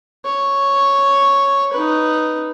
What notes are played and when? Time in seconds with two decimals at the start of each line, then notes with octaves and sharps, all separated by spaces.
0.25 C#5
1.73 D#4 B4